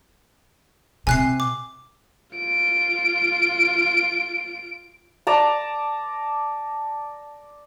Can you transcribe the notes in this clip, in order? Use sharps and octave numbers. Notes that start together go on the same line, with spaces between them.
C3 G#5 F#6 C7
D6
F4 D7
D5 A5 A#5